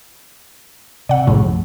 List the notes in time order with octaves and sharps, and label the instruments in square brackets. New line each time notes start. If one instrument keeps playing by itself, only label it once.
[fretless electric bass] C3 [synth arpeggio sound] D5 F#5
[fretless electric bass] B1 F#2 F3 [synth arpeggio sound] A2 C#3